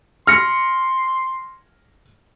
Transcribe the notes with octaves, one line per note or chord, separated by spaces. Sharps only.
C6 F6 A#6 C#7